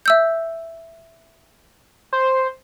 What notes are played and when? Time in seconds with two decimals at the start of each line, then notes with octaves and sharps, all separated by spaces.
0.06 E5 E6 G6
2.13 C5